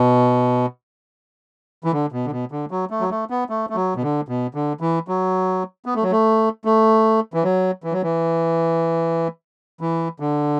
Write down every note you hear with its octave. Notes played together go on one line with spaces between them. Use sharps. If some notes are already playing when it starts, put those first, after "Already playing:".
Already playing: B2
E3
D3
B2
D3
B2
D3
F#3
A3
F#3
A3
B3
A3
A3
F#3
B2
D3
B2
D3
E3
F#3
B3
A3
F#3
A3
A3
E3
F#3
E3
F#3
E3
E3
D3